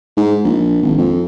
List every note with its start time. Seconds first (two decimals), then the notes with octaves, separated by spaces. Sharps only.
0.17 G#2
0.44 A#1
0.83 G#1
0.98 F2